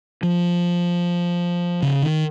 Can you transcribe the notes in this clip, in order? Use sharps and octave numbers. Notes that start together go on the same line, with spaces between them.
F3
C#3
D#3